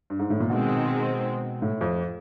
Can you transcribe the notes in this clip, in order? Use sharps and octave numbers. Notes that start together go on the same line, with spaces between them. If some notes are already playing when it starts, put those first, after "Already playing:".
G2
G#2
A2
A#2
B2 D#3 G#3 C4
A2
F2